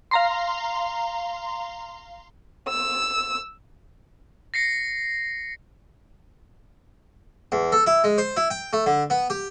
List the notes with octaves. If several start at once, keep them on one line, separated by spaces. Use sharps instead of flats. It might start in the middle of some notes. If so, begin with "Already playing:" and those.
F5 A#5 C6
E6
A#6 C7 C#7
E2
A4
E4
G#3
C5
E4
G5
A3
D3
B3
G4